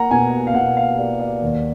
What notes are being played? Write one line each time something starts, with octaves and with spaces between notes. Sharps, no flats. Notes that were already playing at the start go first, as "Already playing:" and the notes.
Already playing: A#3 F#5 A#5
B2 G#5
F5
B2 F#5
F5
A#3 D5
D5
D#2